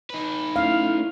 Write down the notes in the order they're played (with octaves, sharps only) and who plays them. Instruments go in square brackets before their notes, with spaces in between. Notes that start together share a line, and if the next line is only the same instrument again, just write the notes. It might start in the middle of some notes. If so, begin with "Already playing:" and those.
[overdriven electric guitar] D#4 B4
[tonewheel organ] A3 C#4 E4 [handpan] F5